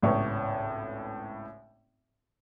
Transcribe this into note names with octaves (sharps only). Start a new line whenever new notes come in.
G#1 C#2 A2 B3 C#5 C#6